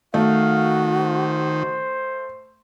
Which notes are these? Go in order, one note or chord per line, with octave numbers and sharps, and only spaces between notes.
D#3 A3 F#4 F5
C5